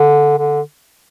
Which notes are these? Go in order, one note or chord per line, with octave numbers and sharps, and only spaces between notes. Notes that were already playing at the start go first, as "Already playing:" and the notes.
Already playing: D3
D3